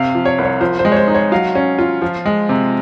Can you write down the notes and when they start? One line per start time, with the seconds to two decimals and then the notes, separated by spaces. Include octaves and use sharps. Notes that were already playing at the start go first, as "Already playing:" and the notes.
Already playing: C3 F5
0.15 F3
0.25 C#5
0.38 C2 C#5
0.61 F3 C5
0.79 C5
0.85 G#3
0.92 C#5
0.96 C5
1.08 D#4
1.14 C#5
1.32 F#3 F5
1.55 C#4
1.79 F4
2.02 F3
2.26 G#3
2.49 C3